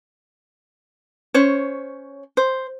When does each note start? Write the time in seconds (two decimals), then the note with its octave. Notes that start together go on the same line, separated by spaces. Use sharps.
1.34 C#4 C5 C#5
2.37 C5